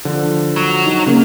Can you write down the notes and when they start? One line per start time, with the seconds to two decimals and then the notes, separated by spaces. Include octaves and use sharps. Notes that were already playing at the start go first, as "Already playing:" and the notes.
0.05 D3 F3
0.56 F#3
0.85 D#4
1.06 C#3 A#3 A#4